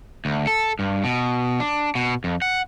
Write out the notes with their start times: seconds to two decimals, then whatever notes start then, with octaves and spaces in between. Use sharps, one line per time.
0.25 D2
0.47 A4
0.79 G2
1.04 B2
1.60 D4
1.95 B2
2.24 F2
2.42 F#5